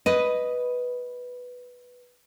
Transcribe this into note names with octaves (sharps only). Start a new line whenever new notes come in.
B4 D#5